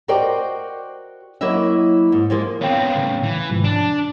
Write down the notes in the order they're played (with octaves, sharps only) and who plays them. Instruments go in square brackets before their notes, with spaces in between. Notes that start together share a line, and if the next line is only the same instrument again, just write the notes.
[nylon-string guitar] F#4 A#4 C5 D5 D#5 G5
F#3 A#3 E4 D#5 E5
G#2
F3 G#3 A#3
[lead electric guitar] B3 C4 [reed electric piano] C#5 F5 G5
[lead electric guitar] A2 C#3
E3
[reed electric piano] G#2 C3 F3
[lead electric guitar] D4
[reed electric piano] A5